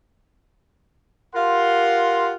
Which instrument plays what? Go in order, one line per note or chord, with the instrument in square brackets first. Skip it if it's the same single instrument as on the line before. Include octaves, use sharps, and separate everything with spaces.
[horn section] F4 G4 A#4 F5 F#5 C6